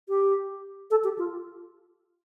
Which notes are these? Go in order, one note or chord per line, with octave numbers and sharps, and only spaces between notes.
G4
A4
G4
F4